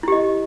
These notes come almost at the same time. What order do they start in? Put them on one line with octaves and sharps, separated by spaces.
E4 G4 D#5